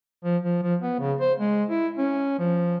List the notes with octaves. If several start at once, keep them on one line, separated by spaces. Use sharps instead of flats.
F3
F3
F3
B3
C#3
C5
G#3
E4
C#4
F3